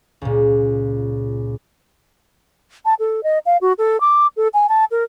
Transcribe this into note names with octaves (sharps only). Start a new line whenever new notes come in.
C#2 A#2
A5
A4
D#5
F5
F#4
A4
D6
A4
G#5
A5
A#4